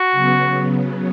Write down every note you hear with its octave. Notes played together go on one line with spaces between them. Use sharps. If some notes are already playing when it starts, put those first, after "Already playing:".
Already playing: F#4
C#3 F#3 B3